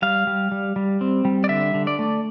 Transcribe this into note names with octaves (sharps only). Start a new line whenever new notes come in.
G3 F5
G3
G3
G3
C4
G3
D5
D3 E5
D3
D5
A3